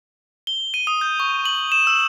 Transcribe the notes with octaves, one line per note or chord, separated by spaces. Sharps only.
G7
D#7
D#6
G6
C#6
F#7
E7
E6